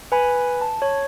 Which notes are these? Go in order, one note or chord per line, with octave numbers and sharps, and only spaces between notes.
B4 G#5 B5
A5
C#5